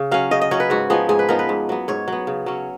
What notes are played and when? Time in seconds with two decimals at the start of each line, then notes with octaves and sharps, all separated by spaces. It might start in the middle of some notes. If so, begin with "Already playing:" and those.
Already playing: C#3
0.11 F#3 C#4 F5
0.31 C#3 D#5
0.41 D#5
0.51 F#3 C#4 C#5
0.60 B4
0.70 G#2 F#4
0.90 F3 B3 D#4 G#4
1.09 G#2 G#4
1.19 B4
1.29 F3 B3 D#4 A#4
1.39 B4
1.49 G#2
1.69 F#3 B3
1.88 G#2 C#5
2.08 F#3 B3
2.27 C#3
2.46 F#3 C#4